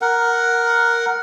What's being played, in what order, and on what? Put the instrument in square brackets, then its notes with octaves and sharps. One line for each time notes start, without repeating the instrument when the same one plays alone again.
[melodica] A#4 F#5